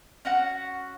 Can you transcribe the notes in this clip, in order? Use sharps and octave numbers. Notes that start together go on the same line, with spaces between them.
C#4 F#4 F#5